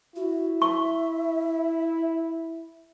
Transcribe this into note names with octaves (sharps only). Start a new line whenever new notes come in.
E4 F#4
E5 C#6